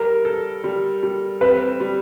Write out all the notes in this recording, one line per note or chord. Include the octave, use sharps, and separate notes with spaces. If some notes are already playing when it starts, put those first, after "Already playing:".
Already playing: G3 A#4
A4
G3
G3
C4 B4
G3